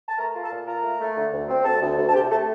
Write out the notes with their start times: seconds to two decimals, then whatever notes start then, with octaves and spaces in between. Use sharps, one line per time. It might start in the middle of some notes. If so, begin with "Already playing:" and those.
0.09 A5
0.18 A3 A#4 A#5
0.35 F4
0.43 A4 A5
0.52 A#2
0.67 F4 A#4 A#5
0.83 A3
1.00 A3
1.16 D3
1.33 D2
1.49 C4
1.65 D2 A4 A5
1.81 D2
1.97 D2
2.09 A5
2.14 C3 G4 G5
2.30 A3 A4 A5